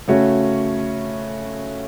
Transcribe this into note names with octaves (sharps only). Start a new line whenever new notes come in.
C#3 A3 C#4 F#4